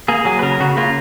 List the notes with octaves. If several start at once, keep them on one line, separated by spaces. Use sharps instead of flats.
A#3 G#4
F#3 G#4
B4
C#3 A#4
C#3 F#4
A#3 F4